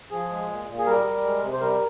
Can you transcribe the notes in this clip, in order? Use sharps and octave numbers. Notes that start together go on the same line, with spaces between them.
F3 G#4
G#3
A#2
A#2
G#4
G3 A#4
G3
G#3
C3
C5
G3 A#4